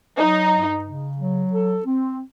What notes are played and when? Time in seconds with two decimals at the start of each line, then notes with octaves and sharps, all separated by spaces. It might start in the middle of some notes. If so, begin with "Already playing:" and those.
0.17 F#3 D#4
0.50 G2
0.83 C#3
1.17 F#3
1.51 A4
1.84 C4